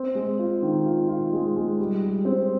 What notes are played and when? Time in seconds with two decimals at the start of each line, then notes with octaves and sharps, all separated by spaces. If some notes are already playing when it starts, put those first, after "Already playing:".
Already playing: C4
0.15 G#3
0.39 F4
0.62 D#3
0.85 F4
1.09 F4
1.33 G#3
1.56 G#3
1.79 G3
2.03 G3
2.25 C4